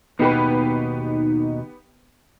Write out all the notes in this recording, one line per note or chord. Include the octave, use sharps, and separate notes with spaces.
D#2 B2 B3 D#4 G4 B4